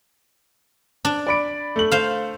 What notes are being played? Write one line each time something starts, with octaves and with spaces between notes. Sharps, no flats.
D4
D5 B5 D7
A3 F#7
C5 F5